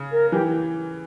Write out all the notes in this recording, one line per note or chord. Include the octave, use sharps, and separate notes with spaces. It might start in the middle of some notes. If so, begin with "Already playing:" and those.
Already playing: C#3
A#4
E3 G4